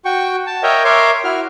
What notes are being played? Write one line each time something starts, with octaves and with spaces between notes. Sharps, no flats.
F#4 G5 C#6
A5
A#4 C#5 D#5 E5 G5 A#5
A#4 C#5 E5 C6 D6
E4 F#4 F6